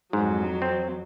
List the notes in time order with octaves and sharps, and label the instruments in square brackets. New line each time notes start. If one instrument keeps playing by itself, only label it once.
[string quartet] F2 F#3 [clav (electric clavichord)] G#2
[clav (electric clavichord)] C4